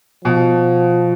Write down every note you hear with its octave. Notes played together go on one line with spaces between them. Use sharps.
B2 F3